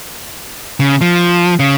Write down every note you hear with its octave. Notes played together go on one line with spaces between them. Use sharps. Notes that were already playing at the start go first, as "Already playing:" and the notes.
C#3
F3
C#3